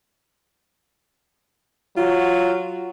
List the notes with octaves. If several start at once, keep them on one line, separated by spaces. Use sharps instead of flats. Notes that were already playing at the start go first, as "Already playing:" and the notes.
F#3 F4